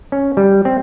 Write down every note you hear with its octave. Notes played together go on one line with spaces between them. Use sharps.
C#4
G3
C4